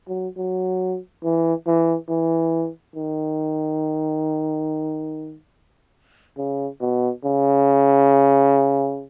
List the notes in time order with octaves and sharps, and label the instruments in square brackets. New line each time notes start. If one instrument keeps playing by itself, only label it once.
[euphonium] F#3
F#3
E3
E3
E3
D#3
C#3
B2
C#3